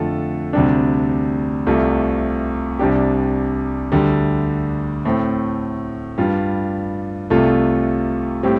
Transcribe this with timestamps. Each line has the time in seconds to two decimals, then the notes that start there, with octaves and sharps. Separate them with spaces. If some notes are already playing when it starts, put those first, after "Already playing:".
Already playing: F2 D3 A3 F4 A4
0.53 D2 C3 G3 D4
1.67 C2 C3 A3 F4
2.79 C2 C3 G3 D4 G4
3.92 D2 D3 G3
5.05 A2 A3 C4
6.18 G2 G3 F4
7.30 C2 C3 A3 F4 A4
8.43 A2 G3 C4 G4